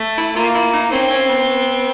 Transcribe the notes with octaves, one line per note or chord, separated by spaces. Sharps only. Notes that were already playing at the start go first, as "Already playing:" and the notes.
Already playing: A3
E4
A#3 F4
E4
D#4
C4 C#4
C#4
B3